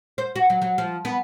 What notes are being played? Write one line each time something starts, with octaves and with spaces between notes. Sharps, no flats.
C5
F#4
F#3
F#3
F3
B3